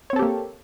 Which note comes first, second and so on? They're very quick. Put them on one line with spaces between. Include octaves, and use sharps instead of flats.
C#5 C4 A4 G4 A#3